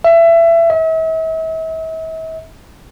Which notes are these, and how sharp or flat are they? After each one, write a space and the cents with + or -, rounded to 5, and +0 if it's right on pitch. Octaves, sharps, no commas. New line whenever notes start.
E5 +25
E5 -40